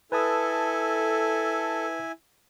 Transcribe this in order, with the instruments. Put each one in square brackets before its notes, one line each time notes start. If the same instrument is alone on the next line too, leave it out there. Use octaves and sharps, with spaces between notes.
[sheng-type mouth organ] E4 G#5 [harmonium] A4 [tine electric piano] B4 A5 D#6